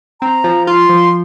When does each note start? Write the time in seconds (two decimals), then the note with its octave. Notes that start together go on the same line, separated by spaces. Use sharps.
0.21 C4 A#5
0.44 F3
0.67 F4 C6
0.89 F3